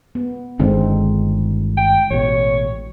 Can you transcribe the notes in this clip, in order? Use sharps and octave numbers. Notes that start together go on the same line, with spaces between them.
B3
G1 D3 D#3 G#3 C4 D#4
G5
A1 B2 C#5